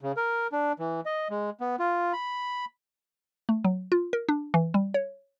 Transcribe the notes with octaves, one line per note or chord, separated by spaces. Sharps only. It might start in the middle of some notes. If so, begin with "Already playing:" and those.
C#3
A#4
D4
E3
D#5
G#3
B3
F4
B5
A3
F#3
F4
A#4
D4
E3
G3
C#5